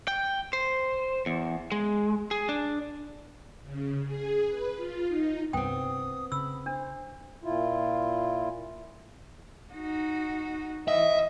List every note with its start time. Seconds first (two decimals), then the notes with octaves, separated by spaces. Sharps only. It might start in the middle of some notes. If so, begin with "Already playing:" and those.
0.08 G5
0.53 C5
1.26 E2
1.72 G#3
2.31 G#4
2.49 D4
3.63 C#3
4.06 G#4
4.46 B4
4.77 F4
5.08 D#4
5.53 C2 G2 B3 C4 G5 D#6
6.32 C#3 B5 E6
6.66 D4 C5
7.44 A#2 E4 F4
9.73 D#4 F#4
10.88 E3 D#5 E5